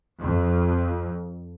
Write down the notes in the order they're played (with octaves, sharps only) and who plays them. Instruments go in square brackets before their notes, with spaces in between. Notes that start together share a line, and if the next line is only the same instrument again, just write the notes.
[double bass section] F2